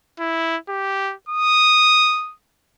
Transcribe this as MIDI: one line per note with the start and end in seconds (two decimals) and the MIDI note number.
0.20 0.57 64
0.69 1.14 67
1.29 2.33 87